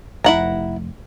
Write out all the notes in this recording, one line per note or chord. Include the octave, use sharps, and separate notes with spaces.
F1 E4 F#5 A#5